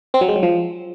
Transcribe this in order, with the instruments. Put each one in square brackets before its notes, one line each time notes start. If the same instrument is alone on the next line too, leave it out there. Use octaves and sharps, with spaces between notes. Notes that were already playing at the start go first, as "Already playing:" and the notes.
[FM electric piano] C4
F#3
G#3
F#3
F3